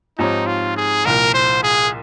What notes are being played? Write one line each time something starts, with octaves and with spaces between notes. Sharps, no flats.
G#2 F3 C4 D#4 G4 C#5
F4
G#4
C2 A#2 F3 A#4
C5
G#4